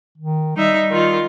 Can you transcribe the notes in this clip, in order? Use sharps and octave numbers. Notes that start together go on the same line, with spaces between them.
D#3
G3 D#4 E5
D#3 F4